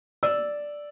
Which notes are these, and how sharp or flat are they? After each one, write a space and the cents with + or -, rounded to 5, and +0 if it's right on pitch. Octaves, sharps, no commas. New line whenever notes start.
D5 +0 E6 +0